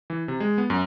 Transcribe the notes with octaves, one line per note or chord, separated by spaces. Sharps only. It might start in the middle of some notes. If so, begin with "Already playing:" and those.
E3
C3
G#3
B3
F#2